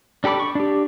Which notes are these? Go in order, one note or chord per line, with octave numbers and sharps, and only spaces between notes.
D4 G4 A4 B5 D6
C#6
D4 G4